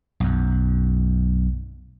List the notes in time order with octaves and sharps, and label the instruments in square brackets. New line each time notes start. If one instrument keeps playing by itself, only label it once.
[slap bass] B1 F#2